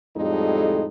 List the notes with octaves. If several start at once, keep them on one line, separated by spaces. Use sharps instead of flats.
F2 A2 G3 G#3 D#4 A4